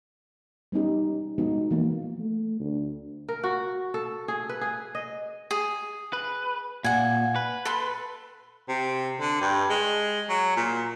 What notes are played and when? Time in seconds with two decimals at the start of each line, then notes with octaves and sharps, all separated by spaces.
0.72 G3 B3 C#4 D#4 G4
1.38 F3 G#3 B3 D#4 F#4
1.71 E3 F3 A#3 B3
2.20 A3
2.60 D2
3.29 A#4
3.43 F#4
3.94 A4
4.28 G#4
4.49 B4
4.61 G#4
4.95 D#5
5.51 G#4
6.13 B4
6.84 A#2 F#5 G#5
7.36 B4
7.65 A4 C6
8.68 C3
9.20 D3
9.41 G2
9.70 G#3
10.29 F#3
10.56 A#2